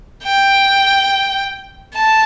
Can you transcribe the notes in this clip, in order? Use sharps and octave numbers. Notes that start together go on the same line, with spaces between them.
G5
A5